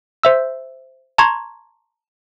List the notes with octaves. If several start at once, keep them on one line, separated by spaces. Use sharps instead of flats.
C5 E5 E6
A5 A#5 C6 C#6 G#6